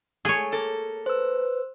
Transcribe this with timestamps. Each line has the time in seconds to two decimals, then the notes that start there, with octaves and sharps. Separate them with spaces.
0.25 A3 G#4 C#5
0.52 A#3 A4
1.06 B4 C5 E6